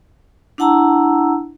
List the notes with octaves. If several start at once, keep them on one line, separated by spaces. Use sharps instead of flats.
D4 E4 F#5 A5 A#5 E6